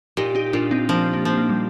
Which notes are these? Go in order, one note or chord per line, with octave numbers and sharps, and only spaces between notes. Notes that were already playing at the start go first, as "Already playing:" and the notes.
A#2 D#4 G4
D#4 G4
A#2 D4 F4
C4 D#4
F3 A#3 D4
A#3 D4
F3 C4
A#3
G3